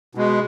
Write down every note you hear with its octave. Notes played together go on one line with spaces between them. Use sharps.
B2 G#3